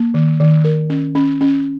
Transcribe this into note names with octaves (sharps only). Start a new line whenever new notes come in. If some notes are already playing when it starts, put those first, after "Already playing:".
Already playing: A#3
D#3
D#3
A#4
C#4
C#4
C#4